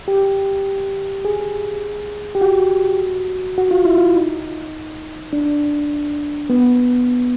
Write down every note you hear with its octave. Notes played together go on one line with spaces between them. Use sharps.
G4
G#4
G4
F#4
F#4
F4
E4
F4
D#4
D4
B3